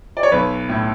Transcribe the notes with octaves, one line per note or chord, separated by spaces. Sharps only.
D5
C#5
B1 B4
A2